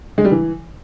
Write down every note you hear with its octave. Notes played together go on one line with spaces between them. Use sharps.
G#3
G3
E3